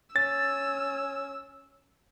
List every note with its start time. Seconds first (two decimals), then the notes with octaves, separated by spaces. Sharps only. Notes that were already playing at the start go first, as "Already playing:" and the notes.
0.16 C#4 E6 A6